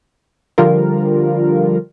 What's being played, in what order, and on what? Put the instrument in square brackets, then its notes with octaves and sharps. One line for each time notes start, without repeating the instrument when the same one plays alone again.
[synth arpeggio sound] D3 F3 G3 F4 A#4